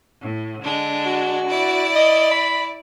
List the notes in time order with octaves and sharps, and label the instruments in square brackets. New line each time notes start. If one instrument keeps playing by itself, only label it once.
[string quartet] A2
D3 G#3 D4
[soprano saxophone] F#4
[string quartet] E4 D5
[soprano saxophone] D#5
B5